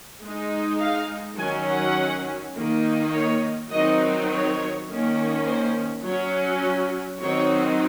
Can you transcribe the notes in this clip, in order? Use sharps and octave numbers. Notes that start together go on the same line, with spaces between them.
G#3 D#4
F5
D#3 F#3 C#4 G#5
F#5
D#3 A#3 D#4
C#5
D#3 F#3 C4 D#4 D#5
C#5
D#3 A#3 C#4
C5
F#3 C#4 C#5
D#3 F#3 C4 D#4 C#5